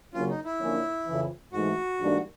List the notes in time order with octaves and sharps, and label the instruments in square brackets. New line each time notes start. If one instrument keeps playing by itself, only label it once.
[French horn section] C#3 F#3 A#3 C#4 [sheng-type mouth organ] F4
[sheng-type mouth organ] D#4
E4
[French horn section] D3 F3 A#3 C#4
F2 C#3 E3
[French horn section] G#2 E3 A3 [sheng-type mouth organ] F#4
[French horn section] G#2 E3 G3 A#3 D4